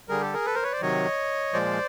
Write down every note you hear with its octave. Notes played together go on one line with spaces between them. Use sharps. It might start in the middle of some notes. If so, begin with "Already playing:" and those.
D3 G3 G#4 A#4
G4 A4
G#4 A#4
A4 B4
A#4 C5
B4 C#5
C5 D5
C3 D#3 F#3 C#5 D#5
A#2 F3 G#3 C5 D5